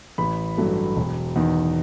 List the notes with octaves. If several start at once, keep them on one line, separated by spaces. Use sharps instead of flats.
A1 B5
G2 F#3 A3
E1
E2 D#3